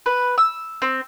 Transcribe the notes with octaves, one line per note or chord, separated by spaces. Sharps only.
B4
E6
C4